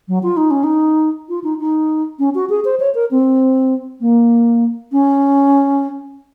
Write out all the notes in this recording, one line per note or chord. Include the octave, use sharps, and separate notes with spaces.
F#3
F4
D#4
C#4
D#4
F4
D#4
D#4
C#4
F#4
G#4
C5
C#5
A#4
C4
A#3
C#4